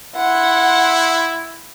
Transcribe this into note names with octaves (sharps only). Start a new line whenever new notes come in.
E4 F#5 C6